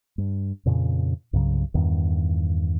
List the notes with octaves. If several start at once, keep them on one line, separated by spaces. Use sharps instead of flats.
G2
F2 A#2 C#3
C2 G2 C#3 F#3
E2 G2 D#3